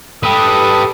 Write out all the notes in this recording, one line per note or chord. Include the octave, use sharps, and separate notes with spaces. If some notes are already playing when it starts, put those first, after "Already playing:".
G4 A4 B4 D#6